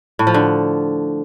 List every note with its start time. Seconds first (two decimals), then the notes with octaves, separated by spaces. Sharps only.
0.19 A2
0.27 F3
0.34 D3